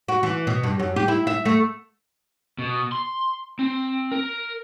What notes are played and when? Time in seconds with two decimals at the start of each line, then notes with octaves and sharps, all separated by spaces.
0.08 F#4
0.23 E3
0.47 B2
0.63 G2
0.79 F#2
0.96 G4
1.08 E4
1.27 E5
1.45 A3
2.59 B2
2.92 C6
3.59 C4
4.12 A#4